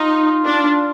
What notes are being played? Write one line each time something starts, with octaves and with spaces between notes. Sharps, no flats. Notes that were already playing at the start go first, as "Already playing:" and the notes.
Already playing: D#4 F4
D4